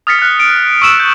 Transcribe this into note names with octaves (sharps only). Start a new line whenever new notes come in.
D#6 F6 A6 B6 C#7
F6 F#6
D7
C#6 E6 E7
G6